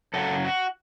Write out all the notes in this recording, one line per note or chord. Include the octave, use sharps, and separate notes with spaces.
F#2 C#3 F#3 A4
F#4